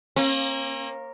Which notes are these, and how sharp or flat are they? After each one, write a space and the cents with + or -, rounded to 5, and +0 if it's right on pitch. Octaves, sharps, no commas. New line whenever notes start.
A#3 +0 C#4 -45